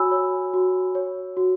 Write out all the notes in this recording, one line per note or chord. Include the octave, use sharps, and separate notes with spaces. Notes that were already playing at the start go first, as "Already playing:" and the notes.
Already playing: F#4 C#5 G#5 B5 E6
C#5
F#4
C#5
F#4